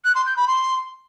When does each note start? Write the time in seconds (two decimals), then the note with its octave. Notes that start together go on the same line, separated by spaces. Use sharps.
0.04 F#6
0.15 C6
0.26 G6
0.37 B5
0.47 C6